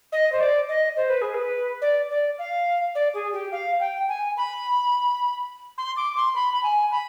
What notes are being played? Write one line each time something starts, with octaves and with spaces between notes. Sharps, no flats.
D#5
C5
D5
D#5
C5
B4
G#4
B4
D5
D5
F5
D5
G#4
G4
F5
G5
G#5
B5
C6
D6
C6
B5
B5
G#5
B5